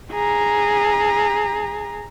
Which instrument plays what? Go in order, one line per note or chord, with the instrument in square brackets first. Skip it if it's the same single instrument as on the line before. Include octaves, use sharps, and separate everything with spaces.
[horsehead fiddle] G#4 A#5